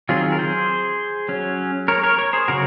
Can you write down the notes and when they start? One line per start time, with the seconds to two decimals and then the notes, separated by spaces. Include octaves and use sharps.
0.09 D#3 F#3 C4 F4 G#4
0.32 A#4
0.39 G#4 C5
1.29 F#3 C#4
1.88 A#4 C#5
2.03 A#4 C#5
2.18 A#4 C#5
2.33 G#4 C5
2.48 C#3 F#3 F#4 A#4